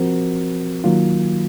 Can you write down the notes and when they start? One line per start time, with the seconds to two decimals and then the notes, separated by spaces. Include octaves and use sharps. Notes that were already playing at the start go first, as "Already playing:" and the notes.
Already playing: F3 C4 F#4 A#4
0.84 D#3 F#3 A#3 F4